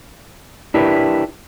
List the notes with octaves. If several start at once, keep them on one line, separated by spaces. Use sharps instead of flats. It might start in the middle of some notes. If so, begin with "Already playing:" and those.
D4 E4 G4 A#4 B4